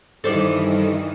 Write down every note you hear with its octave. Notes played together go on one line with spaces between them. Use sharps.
G2 D#3 E3 A4 C5 D5